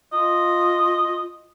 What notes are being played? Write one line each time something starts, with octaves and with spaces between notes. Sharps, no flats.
F4 D#5